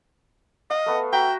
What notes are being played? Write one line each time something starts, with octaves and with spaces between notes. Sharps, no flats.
D#5 F5
A3 B3 A4
F#4 E5 G5 A#5